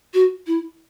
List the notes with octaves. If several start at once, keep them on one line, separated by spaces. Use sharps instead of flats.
F#4
E4